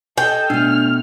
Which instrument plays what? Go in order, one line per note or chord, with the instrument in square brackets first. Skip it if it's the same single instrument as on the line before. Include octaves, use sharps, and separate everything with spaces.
[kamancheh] A4 D#5 [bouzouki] G5
[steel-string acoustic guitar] B2 A3 [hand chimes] D4 [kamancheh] F6